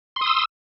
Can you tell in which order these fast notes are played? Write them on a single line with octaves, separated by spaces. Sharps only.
C6 D#6 E6